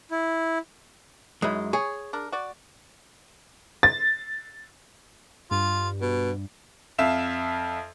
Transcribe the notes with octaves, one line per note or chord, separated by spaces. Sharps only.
E4
F#2 G#3 D#4 E4
G#4 C#5
D4 A#4
F#4 D5
A6
G2 F4
B2
F2 E5 F5 E7